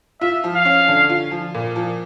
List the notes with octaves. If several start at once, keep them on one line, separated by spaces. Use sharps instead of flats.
F4 E5
F3
F5
C#4
D3
F4
F3
A#2
F3